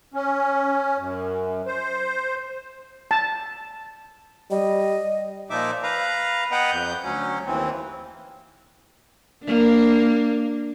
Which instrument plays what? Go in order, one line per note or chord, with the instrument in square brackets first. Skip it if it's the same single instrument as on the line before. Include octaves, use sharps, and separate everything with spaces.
[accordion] C#4
F#2
C5
[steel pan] A5
[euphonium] G3 [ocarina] D#5
[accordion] A#2 F3 D#4 E5 D6
B4 F5 A#5
B3 B4 D#5 F#5 G5 A#5
F2 G6
D2 F#3 C#4
D#2 E3 C4
[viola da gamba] A#3 D4